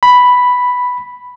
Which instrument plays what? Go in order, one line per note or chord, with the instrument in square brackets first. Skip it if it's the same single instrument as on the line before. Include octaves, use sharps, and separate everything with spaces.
[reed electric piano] B5